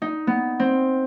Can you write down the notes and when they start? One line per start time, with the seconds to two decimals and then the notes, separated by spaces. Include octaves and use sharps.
0.02 D#4
0.27 B3
0.60 C4